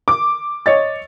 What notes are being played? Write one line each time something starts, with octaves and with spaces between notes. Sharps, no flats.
D6
C#5 D#5 A6